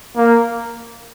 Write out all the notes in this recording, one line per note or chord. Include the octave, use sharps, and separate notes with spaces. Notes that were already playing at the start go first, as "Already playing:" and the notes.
A#3